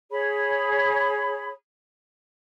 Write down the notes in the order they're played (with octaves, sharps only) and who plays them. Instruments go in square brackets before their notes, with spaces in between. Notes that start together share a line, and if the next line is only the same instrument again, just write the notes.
[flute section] G#4 C#5 B5